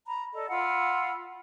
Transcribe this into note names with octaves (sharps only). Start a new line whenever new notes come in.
A#5 B5
A4 D5 D#5
F4 F#5 B5 E6